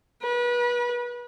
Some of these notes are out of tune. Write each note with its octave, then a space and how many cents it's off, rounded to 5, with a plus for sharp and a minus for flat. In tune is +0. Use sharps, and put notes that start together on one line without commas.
B4 -30